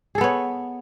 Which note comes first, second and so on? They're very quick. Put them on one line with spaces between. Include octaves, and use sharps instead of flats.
G#4 A4 B3 C#5